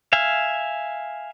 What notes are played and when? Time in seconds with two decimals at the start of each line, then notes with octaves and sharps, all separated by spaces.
0.13 E5 F5 G#5